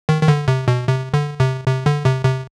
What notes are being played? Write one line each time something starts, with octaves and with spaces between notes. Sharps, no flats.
D#3
D#3
D3
C3
B2
C3
D3
C3
C3
D3
C3
C3